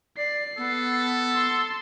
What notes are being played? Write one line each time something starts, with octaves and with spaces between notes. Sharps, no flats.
D5 C7
B3 A4
C6 E6